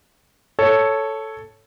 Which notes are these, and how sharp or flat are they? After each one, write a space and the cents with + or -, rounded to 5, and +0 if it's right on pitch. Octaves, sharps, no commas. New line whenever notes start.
A4 +0 C#5 +0